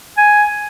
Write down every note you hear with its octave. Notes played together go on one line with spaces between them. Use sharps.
G#5